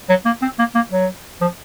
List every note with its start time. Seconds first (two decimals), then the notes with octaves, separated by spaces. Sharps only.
0.09 F#3
0.25 A#3
0.42 C4
0.59 A#3
0.75 A#3
0.92 F#3
1.41 F3